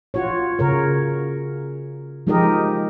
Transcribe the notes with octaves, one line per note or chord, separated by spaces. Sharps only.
F4 F#4 C#5
C#3 A#4 C#5
F3 G#3 D#4 G4 A#4 D#5